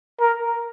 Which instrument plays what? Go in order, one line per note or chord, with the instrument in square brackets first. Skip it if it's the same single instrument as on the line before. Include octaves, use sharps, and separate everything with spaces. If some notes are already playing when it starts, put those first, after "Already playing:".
[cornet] A#4